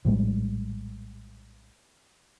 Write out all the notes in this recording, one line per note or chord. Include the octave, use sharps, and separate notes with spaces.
A#1 A2 G3 G#3